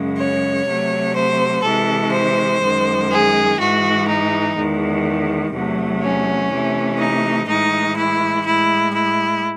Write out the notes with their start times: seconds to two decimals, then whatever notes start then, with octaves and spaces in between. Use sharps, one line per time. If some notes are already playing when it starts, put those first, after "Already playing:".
Already playing: F#2 C#3 G#3
0.18 C#5
0.66 C3 F#3 A3
1.15 C5
1.64 C3 E3 G#3 A4
2.13 C5
2.61 F#2 D#3 G#3
3.10 G#4
3.58 G#2 E3 G#3 F#4
4.07 D#4
4.55 E2 D#3 G#3
5.52 E2 C3 F#3 A3
6.02 C#4
6.50 C3 E3 A3
6.99 D#4
7.48 A2 E3 G#3 D#4
7.96 E4
8.45 A2 G#3 E4
8.95 E4